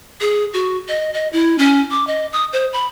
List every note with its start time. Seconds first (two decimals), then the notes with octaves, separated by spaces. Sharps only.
0.21 G#4
0.54 F#4
0.88 D#5
1.14 D#5
1.33 E4
1.58 C#4
1.91 D6
2.07 D#5
2.33 D#6
2.53 C5
2.73 B5